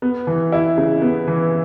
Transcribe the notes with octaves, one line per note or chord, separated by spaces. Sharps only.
B3
E3
E4
C#3
B3
E3